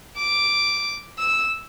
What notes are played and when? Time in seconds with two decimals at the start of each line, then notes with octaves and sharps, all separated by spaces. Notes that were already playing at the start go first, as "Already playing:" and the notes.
0.18 D6
1.19 E6